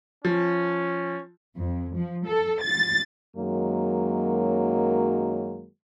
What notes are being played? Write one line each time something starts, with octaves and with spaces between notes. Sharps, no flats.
F3 C#4
F2
F3
A4
A6
F#2 D#3 F#3 G#3 A#3